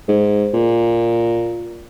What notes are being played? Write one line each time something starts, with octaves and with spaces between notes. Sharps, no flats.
G#2
A#2